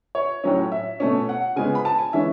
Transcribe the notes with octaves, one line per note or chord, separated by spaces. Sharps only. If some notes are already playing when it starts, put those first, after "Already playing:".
C#5
A2 F#3 C#4
E5
B2 A3 C#4
F#5
C#3 G#3 B3 G#5
B5
A5
G#5
E3 G#3 C#4 E5